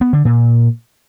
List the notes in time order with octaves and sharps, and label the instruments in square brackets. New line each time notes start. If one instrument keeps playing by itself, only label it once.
[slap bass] B3
D3
A#2